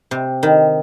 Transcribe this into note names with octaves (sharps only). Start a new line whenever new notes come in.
C3
D#3